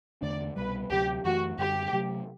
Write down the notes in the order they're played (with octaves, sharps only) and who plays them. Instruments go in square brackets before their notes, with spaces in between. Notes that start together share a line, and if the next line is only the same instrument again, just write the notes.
[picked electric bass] E2 D3 A3 D4 [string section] D5
[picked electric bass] C2 B2 G3 [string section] B4
[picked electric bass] D2 C3 F#3 [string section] G4
[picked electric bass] F#2 E3 A3 [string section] F#4
[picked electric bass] F#2 D3 G3 [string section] G4
[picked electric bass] C3 F#3 A3